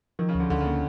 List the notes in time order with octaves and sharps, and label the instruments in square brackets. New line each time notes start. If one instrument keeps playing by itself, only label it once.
[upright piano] D#3 [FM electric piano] F3
[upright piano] C#3
[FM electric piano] D2
[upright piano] D3
[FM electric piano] D2 [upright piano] D3
[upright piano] C#3
[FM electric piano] A#3